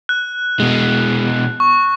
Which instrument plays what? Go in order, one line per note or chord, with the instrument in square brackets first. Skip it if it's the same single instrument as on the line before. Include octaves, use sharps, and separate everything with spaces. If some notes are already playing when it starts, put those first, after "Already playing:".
[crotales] F#6
[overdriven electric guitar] B2 G#3
[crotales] C#6